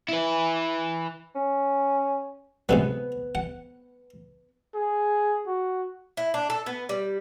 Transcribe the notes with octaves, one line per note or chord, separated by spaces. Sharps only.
E4 B4
C#4
G#2 C3 F#3 B3
F#5
G#4
F#4
E4
D4
A4
B3
G3